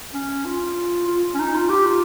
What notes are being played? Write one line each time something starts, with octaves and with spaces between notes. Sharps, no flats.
C#4
F4
F4
C#4
D#4
F4
G4
F4